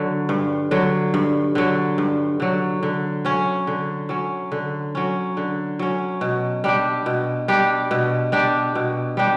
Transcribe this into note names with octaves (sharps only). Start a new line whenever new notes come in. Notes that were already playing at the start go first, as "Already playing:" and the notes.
Already playing: D3 F#3
G2
D3 F#3
G2
D3 F#3
G2
D3 F#3
D3
F#3 C#4
D3
F#3 C#4
D3
F#3 C#4
D3
F#3 C#4
B2
G3 D4 G4
B2
G3 D4 G4
B2
G3 D4 G4
B2
G3 D4 G4